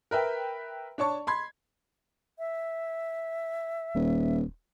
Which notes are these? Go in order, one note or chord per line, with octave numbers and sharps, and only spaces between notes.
A#4 B4 E5 G5
D4 C#5 A5 C#6
B5 C6 G#6
E5
D#1